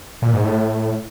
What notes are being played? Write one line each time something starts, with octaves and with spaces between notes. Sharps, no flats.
A#2
G#2
A2